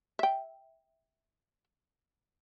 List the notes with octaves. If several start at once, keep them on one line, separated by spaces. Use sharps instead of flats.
E5 G5